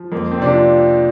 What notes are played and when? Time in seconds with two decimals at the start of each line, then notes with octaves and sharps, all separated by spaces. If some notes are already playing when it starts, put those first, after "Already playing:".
Already playing: F3
0.12 F2 A#3
0.31 C4
0.40 C3 D4
0.49 F4